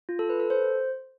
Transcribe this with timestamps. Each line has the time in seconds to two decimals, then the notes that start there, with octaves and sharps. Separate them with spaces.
0.09 F4
0.19 A4
0.29 B4
0.40 A4
0.50 C5